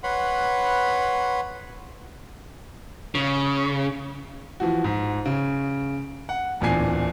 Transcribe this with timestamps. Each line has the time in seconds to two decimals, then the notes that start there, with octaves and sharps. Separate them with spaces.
0.03 B4 C#5 F#5 B5 C6
3.15 C#3
4.60 E3 F3 F#4
4.84 G#2
5.26 C#3
6.29 F#5
6.61 D1 E2 A#2 D4 G#5 C7